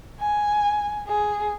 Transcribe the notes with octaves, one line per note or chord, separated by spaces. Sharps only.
G#5
G#4